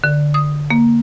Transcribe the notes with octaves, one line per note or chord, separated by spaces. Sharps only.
D3
D#6
A#3